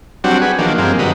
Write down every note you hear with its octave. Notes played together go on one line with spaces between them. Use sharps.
F#3 G3 C4 D4 F#4
G#4 B4
D#3 F3 F#3 A#3 D4
G2 F3 G#3 A#3 C4
G2 D3 F#3 B4 D#5